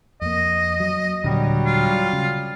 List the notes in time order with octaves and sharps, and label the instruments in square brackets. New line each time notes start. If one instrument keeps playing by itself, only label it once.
[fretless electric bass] F2 A#3 [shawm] D#5
[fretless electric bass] F#3
[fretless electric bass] D#1 A#2 D3 [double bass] F#3 G3
[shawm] F4
[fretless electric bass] C#3